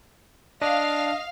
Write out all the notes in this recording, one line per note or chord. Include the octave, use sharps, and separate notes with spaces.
D4 D#5 F5